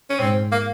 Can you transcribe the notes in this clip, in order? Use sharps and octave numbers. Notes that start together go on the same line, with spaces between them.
C#4
G#2 C4
A#3